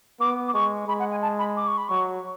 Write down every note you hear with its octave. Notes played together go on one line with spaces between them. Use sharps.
B3 D6
D6
G#3 C#6
G#3 B5
F#5
G#5
A5
B5
D6
C#6
B5
F#3 C#6